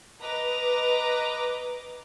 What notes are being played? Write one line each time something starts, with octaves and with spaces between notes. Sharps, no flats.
B4 D#5 A#5 D6